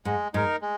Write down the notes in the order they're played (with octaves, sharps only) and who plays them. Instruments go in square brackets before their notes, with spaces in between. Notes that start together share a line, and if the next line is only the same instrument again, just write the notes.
[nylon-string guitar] G#2 [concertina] G#3
[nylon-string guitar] G#2 [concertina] D#4 A#4
[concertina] G#3